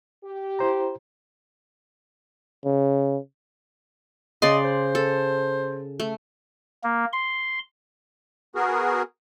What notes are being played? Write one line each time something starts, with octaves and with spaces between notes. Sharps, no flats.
G4
E4 C5 A#5
C#3
C#3 D5 D#5 C6
C5
A4
A3
A#3
C6
B3 F#4 G#4 A#4